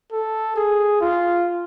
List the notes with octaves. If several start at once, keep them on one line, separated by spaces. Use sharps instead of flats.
A4
G#4
F4